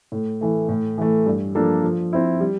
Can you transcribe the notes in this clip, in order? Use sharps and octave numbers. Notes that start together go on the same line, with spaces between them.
A2
E3 A3
A2
E3 A3
G2
F3 A#3 D4 A4
F3
C4 E4
G3